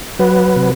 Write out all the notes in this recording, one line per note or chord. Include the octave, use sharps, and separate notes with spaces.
F#3 B4
C3